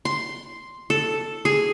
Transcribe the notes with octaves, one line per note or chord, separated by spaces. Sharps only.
C6
A4
G#4